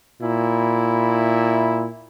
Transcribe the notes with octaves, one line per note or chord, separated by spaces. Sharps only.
A#2 E4